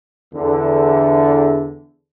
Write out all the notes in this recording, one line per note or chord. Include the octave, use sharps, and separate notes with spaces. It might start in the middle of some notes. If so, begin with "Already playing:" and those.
E2 D3